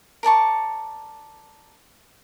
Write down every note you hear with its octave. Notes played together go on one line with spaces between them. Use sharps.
A#4 D5 A5 C#6